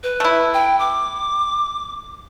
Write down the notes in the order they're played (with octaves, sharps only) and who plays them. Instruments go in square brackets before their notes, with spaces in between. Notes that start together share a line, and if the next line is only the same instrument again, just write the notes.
[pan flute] B4
[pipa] A3 E4
[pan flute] G5
D6